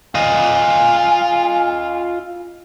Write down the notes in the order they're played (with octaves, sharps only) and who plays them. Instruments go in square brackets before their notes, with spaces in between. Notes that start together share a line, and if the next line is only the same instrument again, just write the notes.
[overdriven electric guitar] F4 D#5 [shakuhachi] G#5